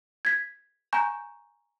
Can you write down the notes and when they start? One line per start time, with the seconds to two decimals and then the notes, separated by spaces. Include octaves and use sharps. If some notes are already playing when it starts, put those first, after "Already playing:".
0.25 G#6 B6
0.93 G#5 A#5 C#6 G6 E7